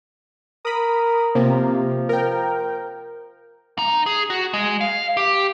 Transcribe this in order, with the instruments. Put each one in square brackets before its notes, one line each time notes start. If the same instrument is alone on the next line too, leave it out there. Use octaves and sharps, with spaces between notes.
[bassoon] A#4 [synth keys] B5 D#6
[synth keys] C3 A#3 [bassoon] F3
[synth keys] A#4 G5
[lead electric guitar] D#4
G#4
F#4
G#3
F5
G4